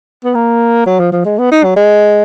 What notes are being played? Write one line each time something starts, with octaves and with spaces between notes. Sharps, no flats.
B3
A#3
F#3
F3
F3
G#3
B3
D#4
F#3
G#3